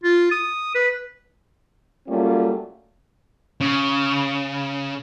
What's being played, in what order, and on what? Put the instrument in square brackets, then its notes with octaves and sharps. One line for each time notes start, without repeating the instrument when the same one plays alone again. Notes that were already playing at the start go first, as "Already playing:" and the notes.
[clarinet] F4
D#6
B4
[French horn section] F#3 G3 A3 A#3 C#4 F4
[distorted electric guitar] C#3